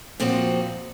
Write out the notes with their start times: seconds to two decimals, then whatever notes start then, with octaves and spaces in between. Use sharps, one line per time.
0.20 A#2 F3 C4 D#4 F#4